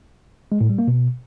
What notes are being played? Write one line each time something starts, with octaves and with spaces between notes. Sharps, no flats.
G#3
A2
G3
A#3
B2